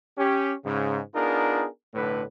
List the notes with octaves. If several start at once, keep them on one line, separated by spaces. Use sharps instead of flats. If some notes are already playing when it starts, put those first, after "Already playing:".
C#4 G4
G#2 C#3
B3 D4 D#4 F4 G#4 A#4
B1 A2 D3 A3 B4